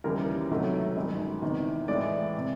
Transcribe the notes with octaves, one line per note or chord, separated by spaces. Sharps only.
E1 D#2 C#3 E3 G3 A#4
C#2 C3 D#3 F#3 A3
G1 F#2 D#3 G#3
E2 C3 D#3
A2 E3 G#3 D5
C3